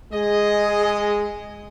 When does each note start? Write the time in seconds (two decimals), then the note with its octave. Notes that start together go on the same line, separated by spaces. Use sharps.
0.12 G#3 G#4 D#5